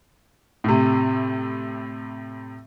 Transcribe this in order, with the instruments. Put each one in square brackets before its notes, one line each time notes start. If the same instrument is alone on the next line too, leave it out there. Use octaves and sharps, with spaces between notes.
[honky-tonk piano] A2 C3